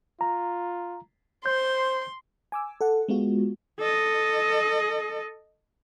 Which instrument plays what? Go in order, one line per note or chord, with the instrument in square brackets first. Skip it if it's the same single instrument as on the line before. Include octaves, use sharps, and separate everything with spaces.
[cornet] F4 [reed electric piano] A#5
[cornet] C5 [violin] C6 [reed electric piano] G6
[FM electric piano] G#5 D6 E6
A4 F#5
G#3 B3 F4 F#4
[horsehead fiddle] A4 D#5